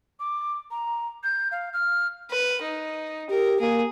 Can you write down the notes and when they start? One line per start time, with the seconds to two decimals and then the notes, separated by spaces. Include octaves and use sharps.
0.20 D6
0.71 A#5
1.24 G6
1.52 F5
1.73 F6
2.31 B4
2.62 D#4
3.30 G4 A#4
3.61 A#3 G#4